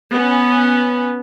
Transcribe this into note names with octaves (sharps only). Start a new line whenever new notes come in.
B3 C#4